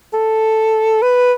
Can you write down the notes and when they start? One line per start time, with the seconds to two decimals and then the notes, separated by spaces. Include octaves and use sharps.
0.14 A4
1.02 B4